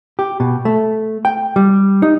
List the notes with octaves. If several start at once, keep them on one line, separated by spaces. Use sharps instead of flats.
G4
B2
A3
G5
G3
D#4